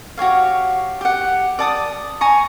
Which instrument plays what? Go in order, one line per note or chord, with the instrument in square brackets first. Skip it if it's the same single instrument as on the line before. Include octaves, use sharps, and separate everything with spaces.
[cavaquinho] F#4 G4 C#5 F5
G4 F#5
D5 A5 D#6
G#5 A#5 C#6